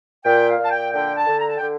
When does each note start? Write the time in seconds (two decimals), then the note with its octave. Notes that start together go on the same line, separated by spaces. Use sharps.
0.24 A#2 G5
0.48 F5
0.58 A#2
0.64 A5
0.70 G5
0.92 D3 G5
1.15 A5
1.27 D3
1.38 A#5
1.47 A5
1.57 D3 G5